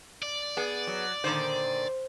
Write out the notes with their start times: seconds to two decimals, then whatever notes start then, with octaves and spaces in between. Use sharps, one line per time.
0.22 D5
0.57 B3 G#4
0.87 F#3
1.24 A#2 D3 D#3 C5